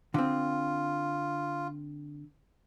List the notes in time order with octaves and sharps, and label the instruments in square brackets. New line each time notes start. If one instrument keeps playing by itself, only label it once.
[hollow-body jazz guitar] D3 C4 [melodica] F4